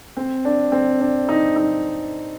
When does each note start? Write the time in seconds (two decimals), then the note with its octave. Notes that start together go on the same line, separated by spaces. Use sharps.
0.17 C4
0.45 D4
0.72 C4
1.00 D4
1.29 D#4
1.56 D#4